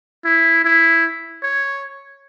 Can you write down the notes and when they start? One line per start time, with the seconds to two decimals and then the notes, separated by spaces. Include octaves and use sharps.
0.25 E4
0.65 E4
1.43 C#5